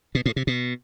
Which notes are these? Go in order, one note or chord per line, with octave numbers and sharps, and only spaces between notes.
B2
A2
C3
B2